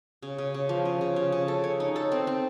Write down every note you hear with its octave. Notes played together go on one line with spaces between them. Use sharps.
C#3
C#3
C#3
F3
C#3
C#3
C#3
C#3
A4
C#5
D#4
A4
C4
C4